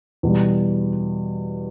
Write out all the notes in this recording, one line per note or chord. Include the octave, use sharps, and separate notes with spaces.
E2 B2 G3